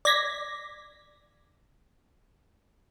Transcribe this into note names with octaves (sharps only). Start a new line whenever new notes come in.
D5 G#6 A#6 B6